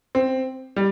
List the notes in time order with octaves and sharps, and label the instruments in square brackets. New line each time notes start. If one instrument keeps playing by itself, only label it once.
[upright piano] C4
G3